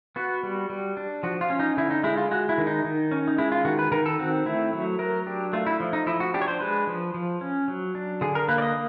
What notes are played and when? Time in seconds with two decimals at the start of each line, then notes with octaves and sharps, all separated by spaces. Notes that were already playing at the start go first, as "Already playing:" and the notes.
0.16 B3 F#4
0.43 G3
0.70 G3
0.97 D4
1.23 F3 F#4
1.41 F4
1.50 C#4
1.59 D#4
1.77 D3 E4
1.91 D#4
2.04 G#3 E4
2.17 F4
2.31 G#3 F#4
2.49 E4
2.58 D#3
2.67 D#4
2.84 D#3
3.11 C#4
3.28 D#4
3.38 G#3 E4
3.52 F4
3.65 D#3 F#4
3.79 B4
3.92 D#3 A#4
4.06 A4
4.19 C4 F#4
4.46 A3 E4
4.73 F#3
4.99 F#3 A#4
5.26 D4 G4
5.53 A3 F4
5.66 E4
5.80 F3
5.93 D#4
6.07 F3 E4
6.20 F#4
6.34 D4 G4
6.42 C#5
6.48 C5
6.60 G#3 B4
6.87 F3
7.14 F3
7.41 C#4
7.68 F#3
7.95 D4
8.21 D3 G#4
8.35 A#4
8.48 A#3 B4
8.58 D5
8.62 D#5